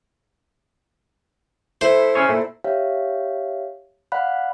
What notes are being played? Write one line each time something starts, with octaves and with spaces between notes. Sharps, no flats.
A3 E4 C5
C#4 G#4 C#5
A#2 A3
G4 C#5 E5 F5
D5 F5 F#5 B5 F#6